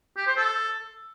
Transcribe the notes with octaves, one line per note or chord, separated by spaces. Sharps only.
G4
C5
A4